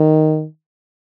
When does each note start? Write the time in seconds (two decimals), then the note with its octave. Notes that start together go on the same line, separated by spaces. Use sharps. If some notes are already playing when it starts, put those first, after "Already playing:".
Already playing: D#3